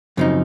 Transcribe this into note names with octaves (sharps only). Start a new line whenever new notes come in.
F#2 C#3 F3 C4 D#4